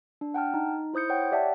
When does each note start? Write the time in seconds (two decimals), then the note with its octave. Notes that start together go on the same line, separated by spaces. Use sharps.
0.21 D4
0.34 F#5 G5 A5 F6
0.54 D#4
0.94 E4 C5 D#6 G6 C#7
1.10 C#5 F#5 G5
1.32 G4 D5 E5 F#5 G5 A5